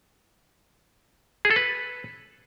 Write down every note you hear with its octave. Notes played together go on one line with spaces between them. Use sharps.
G#4
A4
B4